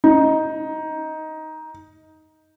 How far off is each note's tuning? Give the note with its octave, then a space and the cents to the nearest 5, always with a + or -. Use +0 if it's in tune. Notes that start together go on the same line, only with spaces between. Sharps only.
D#4 +10